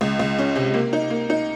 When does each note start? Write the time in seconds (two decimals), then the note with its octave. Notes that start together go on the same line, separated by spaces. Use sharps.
0.01 C#2
0.19 C#2
0.39 C#4
0.56 C3
0.74 A#3
0.93 D#4
1.10 A#3
1.30 D#4